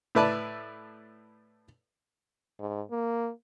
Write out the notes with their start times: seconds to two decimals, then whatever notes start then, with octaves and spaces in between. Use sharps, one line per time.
0.15 A2 E4 B4 D5 A5
2.60 G#2
2.91 A#3